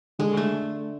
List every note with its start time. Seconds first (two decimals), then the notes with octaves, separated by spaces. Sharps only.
0.19 D3 G#3
0.37 A3